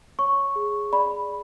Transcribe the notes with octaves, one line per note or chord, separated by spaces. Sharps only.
C#5 C#6
G#4
D5 B5